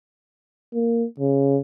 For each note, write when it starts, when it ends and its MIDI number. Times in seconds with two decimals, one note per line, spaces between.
0.74 1.05 58
1.20 1.59 49